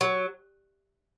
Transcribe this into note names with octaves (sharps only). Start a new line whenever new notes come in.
F#3